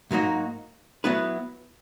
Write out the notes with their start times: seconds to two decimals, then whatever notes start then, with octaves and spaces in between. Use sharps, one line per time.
0.11 G#2 F#3 A#3 D#4 F#4
1.04 F#3 B3 E4 B4